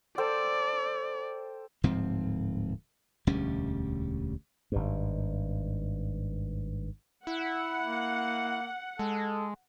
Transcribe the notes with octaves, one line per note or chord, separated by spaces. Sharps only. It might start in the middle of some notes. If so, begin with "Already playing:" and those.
A4 C5 D5 G5
D1 G#2 F3 C4
E1 D2 G3 C#4
G#1 G2
E4 F#5
A#3
G#3 A4